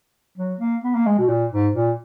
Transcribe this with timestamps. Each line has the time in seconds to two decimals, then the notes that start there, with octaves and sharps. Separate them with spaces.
0.38 F#3
0.60 A#3
0.84 B3
0.95 A#3
1.06 G#3
1.18 B2
1.29 A#2
1.52 G#2
1.75 A#2